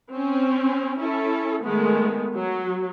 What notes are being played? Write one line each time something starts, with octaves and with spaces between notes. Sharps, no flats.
C4 C#4
C#4 E4 A4
D#3 G#3 A3 B3
F#3